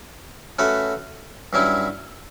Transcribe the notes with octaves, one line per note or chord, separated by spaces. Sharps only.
A3 C#4 F#4 B4 E5
G2 F#3 C#4 E4